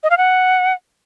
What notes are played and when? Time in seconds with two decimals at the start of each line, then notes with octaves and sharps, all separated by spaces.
0.03 D#5
0.11 F5
0.18 F#5